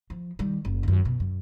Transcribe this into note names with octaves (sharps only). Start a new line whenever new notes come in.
F3
D#3 G3
F#1
F#2 D#3
B2
F#2